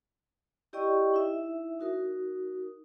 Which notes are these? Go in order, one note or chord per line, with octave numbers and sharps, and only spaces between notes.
E4 G4 D5 D#5 G5 C#6
D#4 E4 E5
D#4 F#4 A#4 D#6